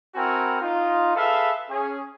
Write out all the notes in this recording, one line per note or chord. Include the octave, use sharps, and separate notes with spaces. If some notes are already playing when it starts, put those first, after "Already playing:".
C4 E4 F#4 A#4 G5 G#5
D#4 F4
G#4 A4 B4 E5 F5
C#4 G#4